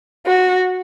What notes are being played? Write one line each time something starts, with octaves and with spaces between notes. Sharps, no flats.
F#4